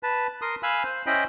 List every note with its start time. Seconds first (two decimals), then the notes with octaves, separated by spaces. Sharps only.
0.03 B4 A5
0.42 A#4 C6 D#6
0.63 F5 G#5 B5 E6 F#6
0.83 C5
1.07 C#4 E4 C5 D#5 G5 B5